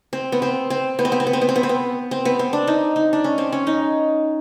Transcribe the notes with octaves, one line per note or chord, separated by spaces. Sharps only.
C4
B3
C4
C4
B3
C4
B3
C4
B3
C4
B3
C4
B3
C4
B3
C4
B3
C4
D4
D#4
D#4
D4
C#4
C4
C#4
D#4